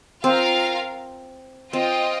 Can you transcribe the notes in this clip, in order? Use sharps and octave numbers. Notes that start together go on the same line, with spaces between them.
C4 F4 A#4 F5
C4 F4 D#5 G5